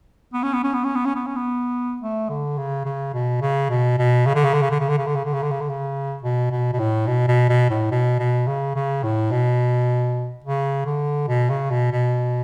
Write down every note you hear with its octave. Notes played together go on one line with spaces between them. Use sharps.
B3
C#4
B3
C#4
B3
C#4
B3
C#4
B3
C#4
B3
A3
D3
C#3
C#3
B2
C#3
B2
B2
C#3
D3
C#3
D3
C#3
D3
C#3
D3
C#3
D3
C#3
D3
C#3
D3
C#3
D3
C#3
B2
B2
B2
A2
B2
B2
B2
A2
B2
B2
C#3
C#3
A2
B2
C#3
D3
B2
C#3
B2
B2